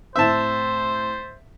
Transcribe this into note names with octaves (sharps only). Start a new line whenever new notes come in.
A2 C4 C5 E5 A5 E6